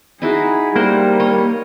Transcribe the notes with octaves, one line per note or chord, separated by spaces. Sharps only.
D#4 E4 F#4 G#4
G3 A#3 A#4 C5 F#5
C#5 D#5